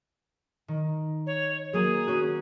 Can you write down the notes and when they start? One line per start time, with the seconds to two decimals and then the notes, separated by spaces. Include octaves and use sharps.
0.68 D#3
1.26 C#5
1.73 F#3 A#3 G#4
2.07 A#3 C#4 F#4